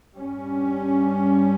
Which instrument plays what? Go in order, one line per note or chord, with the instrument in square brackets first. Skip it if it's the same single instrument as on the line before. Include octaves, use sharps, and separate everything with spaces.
[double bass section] G2 G3 C#4